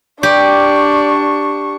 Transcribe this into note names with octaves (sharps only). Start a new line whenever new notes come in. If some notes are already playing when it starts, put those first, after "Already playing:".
D4 G4 D5 C#6